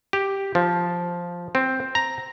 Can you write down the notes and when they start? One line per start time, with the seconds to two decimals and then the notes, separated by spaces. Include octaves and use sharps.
0.13 G4
0.55 F3
1.55 C4
1.95 A#5